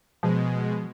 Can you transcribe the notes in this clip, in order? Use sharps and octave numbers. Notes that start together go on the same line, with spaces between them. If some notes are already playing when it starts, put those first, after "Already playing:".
B2 F3 G#3